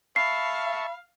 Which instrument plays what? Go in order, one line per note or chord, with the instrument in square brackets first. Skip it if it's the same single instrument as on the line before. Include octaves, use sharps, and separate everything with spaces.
[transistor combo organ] E5 A5 C#6 [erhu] F5 [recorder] B5 [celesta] C7